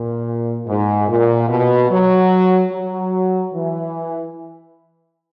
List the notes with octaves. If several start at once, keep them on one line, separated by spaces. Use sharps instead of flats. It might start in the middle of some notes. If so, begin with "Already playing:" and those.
Already playing: A#2
G#2
A#2
B2
F#3
F#3
E3